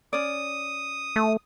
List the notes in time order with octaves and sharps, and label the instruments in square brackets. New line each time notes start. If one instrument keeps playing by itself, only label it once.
[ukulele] C#4 D5 [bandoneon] D#6
[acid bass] A3